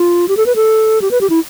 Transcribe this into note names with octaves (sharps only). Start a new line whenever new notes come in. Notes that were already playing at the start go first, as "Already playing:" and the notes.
Already playing: F4
G4
A4
B4
A4
G4
B4
G4
E4